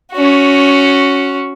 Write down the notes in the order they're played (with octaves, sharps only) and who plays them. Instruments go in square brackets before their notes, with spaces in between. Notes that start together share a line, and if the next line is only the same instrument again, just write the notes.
[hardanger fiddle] C#4 F#4